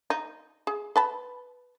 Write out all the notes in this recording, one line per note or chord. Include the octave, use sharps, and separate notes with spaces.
D#4
G#4
B4 A5 B5